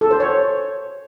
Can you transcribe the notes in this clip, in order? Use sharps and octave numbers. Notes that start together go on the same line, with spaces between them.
A4
C5
C#5